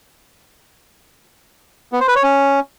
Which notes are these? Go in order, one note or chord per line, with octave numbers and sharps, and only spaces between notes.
B3
C5
B4
C#5
C#4